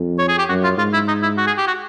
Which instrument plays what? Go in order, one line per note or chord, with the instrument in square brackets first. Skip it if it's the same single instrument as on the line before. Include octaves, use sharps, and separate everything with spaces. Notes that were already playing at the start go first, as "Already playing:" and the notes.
Already playing: [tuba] F2
[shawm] C#5
G#4
G4
[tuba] F#2 [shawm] F#4
[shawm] F4
[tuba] G#2 [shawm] F4
[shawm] E4
D#4
E4
F#4
G#4
G4
F#4